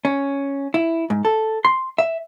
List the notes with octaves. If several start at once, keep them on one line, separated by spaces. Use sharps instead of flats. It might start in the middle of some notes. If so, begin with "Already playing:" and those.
C#4
E4
G#2
A4
C6
E5